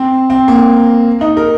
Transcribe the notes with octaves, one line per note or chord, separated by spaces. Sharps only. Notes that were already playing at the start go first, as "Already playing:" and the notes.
Already playing: C4
C4
A#3
D#4
A#4